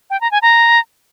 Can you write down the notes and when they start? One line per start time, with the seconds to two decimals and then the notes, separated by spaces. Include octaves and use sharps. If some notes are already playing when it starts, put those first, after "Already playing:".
0.10 G5
0.21 A#5
0.32 G#5
0.42 A#5